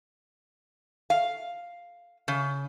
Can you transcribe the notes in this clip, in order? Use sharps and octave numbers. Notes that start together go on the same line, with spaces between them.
F5
C#3